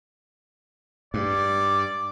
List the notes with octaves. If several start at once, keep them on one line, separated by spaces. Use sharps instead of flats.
G2 D5